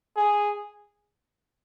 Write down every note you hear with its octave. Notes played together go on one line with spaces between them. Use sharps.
G#4